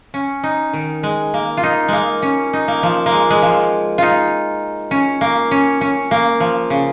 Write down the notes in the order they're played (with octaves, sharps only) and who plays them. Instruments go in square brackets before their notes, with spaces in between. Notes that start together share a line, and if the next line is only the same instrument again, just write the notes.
[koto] C#4
D#4
D#3
G#3
A#3
F4
D#4
G#3 A#3
C#4
D#4
A#3
F3
A#3
G#3
G#3
F3
D#4 F4
C#4
A#3
C#4
C#4
A#3
F3
C#3